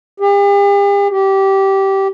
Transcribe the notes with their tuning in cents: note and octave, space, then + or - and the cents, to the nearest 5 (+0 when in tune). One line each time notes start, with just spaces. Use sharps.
G4 +45
G4 -15